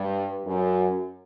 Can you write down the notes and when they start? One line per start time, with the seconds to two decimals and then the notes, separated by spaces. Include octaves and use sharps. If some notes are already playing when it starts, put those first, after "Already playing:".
Already playing: G2
0.45 F#2